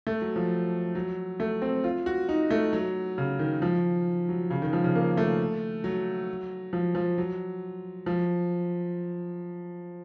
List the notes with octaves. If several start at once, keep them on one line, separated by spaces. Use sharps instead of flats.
A3
F#3
F3
F#3
A3
C4
F4
F#4
D#4
A3
F#3
C#3
D#3
F3
F#3
C#3
D#3
F3
C#3
A#3
A3
F#3
F3
F3
F#3
F3